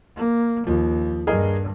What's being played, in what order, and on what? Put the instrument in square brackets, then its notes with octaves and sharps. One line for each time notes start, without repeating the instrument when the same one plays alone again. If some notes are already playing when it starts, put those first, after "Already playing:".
[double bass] A#3
[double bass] D#2 [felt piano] F3
[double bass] G2 [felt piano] G#4 A#4 D#5